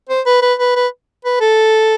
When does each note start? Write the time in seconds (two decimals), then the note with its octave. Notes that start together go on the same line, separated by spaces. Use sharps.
0.09 C5
0.26 B4
0.42 B4
0.59 B4
0.76 B4
1.25 B4
1.41 A4